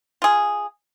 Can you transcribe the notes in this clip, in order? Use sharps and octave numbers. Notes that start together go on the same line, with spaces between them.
F4 G#4